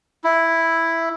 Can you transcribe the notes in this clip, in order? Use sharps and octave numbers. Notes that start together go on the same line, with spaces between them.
E4